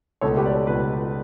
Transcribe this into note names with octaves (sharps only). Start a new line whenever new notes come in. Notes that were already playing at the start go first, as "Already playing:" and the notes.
C#2 B2 A3 A4 C#5
G4 B4
D5
A4 C#5
C#2 B2 A3 G4 B4